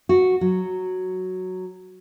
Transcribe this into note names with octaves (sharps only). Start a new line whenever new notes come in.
F#4
F#3